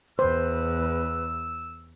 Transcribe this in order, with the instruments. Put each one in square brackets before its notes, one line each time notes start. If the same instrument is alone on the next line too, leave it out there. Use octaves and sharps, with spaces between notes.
[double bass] E2 [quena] B4 [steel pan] C5 [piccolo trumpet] E6